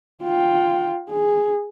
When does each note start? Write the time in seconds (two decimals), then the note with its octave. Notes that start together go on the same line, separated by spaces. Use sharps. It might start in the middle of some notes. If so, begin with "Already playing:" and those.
0.23 F4 G5
1.11 G#4